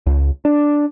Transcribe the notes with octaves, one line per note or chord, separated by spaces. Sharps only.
C#2
D4